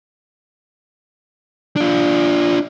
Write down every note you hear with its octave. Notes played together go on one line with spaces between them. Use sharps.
D4 F4